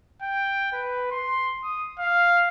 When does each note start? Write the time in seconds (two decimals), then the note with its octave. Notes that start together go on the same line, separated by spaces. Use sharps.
0.22 G5
0.73 B4
1.11 C6
1.64 D#6
1.99 F5